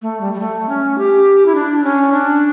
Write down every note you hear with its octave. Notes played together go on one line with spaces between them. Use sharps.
A3
G3
G3
A3
C#4
G4
E4
D4
C#4
D4